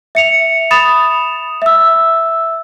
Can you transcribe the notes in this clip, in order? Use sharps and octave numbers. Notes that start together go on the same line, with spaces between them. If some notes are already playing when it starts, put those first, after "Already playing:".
E5 C#7 F7
B5 D#6 A6 E7 F7
E5 E6